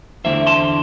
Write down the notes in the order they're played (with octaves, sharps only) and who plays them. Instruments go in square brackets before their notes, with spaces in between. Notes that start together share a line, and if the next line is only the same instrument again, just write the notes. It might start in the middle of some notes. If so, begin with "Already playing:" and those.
[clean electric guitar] E2 D3 A3 C4 E4 C5 E5
A5 C6